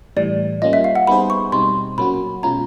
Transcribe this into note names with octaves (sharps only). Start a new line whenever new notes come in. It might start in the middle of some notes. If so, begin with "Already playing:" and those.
A2 E3 G3 D5
G3 A#3 C#4 F4 D#5
E5
F5
F#5
G3 B3 D#4 G#4 C5 B5
C#6
B2 G3 C4 D#4 C6
A#2 F#3 A#3 C#4 F#4 B5
B2 G#3 C#4 F4 A#5